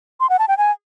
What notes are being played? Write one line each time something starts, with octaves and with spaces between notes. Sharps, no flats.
C6
F#5
A5
G5
G#5